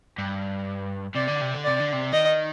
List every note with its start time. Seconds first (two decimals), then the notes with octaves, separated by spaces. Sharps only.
0.18 G2
1.15 C3 D5
1.28 D3
1.41 C3
1.54 D3
1.64 C3 D5
1.80 D3
1.93 C3
2.13 D#3 D#5